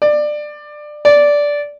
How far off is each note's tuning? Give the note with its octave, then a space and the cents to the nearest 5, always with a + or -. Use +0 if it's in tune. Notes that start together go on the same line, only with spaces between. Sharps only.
D5 +20
D5 -10